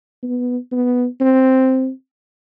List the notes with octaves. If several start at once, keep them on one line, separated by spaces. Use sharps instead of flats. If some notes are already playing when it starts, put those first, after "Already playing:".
B3
B3
C4